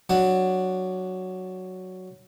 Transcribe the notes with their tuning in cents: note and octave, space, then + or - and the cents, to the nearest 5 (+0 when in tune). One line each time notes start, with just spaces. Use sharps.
F#3 +0 D4 +15 F#5 +0